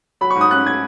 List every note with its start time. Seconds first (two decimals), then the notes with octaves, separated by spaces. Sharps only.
0.21 F#3 B5
0.30 G#2 C#6
0.41 D#6
0.51 C#4 F#6
0.66 G#6